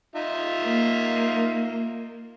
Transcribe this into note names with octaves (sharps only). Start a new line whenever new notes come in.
D#4 F4 E5
A#3